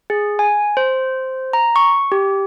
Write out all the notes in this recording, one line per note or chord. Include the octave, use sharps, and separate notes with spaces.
G#4
G#5
C5
A#5
C#6
G4